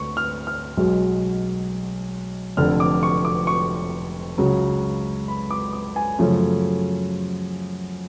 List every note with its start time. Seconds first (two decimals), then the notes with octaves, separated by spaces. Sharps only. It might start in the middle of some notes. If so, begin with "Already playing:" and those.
Already playing: D2 C#6
0.17 F6
0.47 F6
0.77 B1 B2 G#3
2.57 F1 F2 D3 F6
2.80 D6
3.03 C#6
3.25 D6
3.47 C#6
4.38 C#2 C#3 F#3
5.28 B5
5.51 D6
5.73 D6
5.96 G#5
6.18 F#2 C#3 F3 A3 C#4